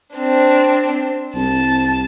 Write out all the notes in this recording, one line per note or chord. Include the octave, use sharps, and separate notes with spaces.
C4 D4
C2 A5